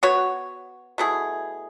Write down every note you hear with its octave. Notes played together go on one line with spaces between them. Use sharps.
B3 F#4 C#5
B2 A3 E4 G#4